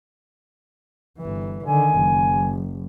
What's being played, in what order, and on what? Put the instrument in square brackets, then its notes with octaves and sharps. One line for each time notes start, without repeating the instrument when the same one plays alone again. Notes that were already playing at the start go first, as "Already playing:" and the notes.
[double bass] G1 E3
[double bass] D3 D#3 [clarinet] G#5
[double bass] F#1